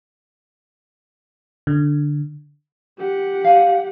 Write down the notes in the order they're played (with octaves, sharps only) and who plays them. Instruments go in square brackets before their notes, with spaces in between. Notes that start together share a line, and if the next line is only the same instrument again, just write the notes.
[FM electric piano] D3
[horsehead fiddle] G4 F#5
[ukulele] F5 G#5